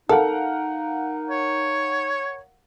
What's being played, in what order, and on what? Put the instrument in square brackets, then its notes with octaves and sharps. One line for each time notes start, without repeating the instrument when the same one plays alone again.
[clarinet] D#4 [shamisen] A4 [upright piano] A#4 F5 F#5
[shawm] C#5